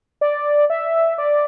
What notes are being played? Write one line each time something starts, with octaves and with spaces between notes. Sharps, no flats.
D5
E5
D5